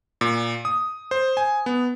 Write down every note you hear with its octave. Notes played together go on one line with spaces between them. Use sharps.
A#2
D#6
C5
G#5
B3